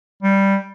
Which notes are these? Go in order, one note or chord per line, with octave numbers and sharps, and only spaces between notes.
G3